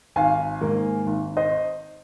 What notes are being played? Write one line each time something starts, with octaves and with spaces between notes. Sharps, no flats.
G#1 F5 G#5
G#2 D#3 A#3
G#1
C5 D#5